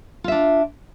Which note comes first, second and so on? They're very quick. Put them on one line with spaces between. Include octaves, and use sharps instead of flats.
F4 E5 D4